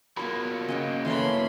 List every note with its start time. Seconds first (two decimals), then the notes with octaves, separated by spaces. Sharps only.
0.17 F#3 A#3 B3 F4 B5
0.69 C#3 D#5 F#5 G5
1.05 E3 A3 C#4 B5 C6